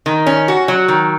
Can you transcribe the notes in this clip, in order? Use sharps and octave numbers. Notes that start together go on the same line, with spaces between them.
D#3
C#4
F#4
F#3
D#3